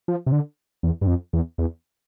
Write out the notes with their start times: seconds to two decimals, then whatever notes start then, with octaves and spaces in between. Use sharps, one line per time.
0.08 F3
0.26 C3
0.32 D3
0.83 E2
1.01 G2
1.07 F2
1.33 E2
1.58 E2